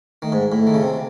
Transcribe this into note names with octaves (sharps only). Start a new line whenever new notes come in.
D#3 A3
G#2
A2 A3
D#3
C#3
C3